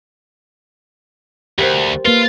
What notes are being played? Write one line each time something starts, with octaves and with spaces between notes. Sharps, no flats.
D2 G4 A#4 C5
A#3 F4 B4